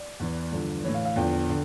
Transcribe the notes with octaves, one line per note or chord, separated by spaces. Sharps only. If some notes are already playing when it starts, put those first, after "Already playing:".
Already playing: D5
E2 E3
G2 D3 F3
A2 E3 C#5
F5
F5
E2 D3 F3 G5
D3